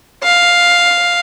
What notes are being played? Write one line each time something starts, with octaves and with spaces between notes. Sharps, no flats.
F5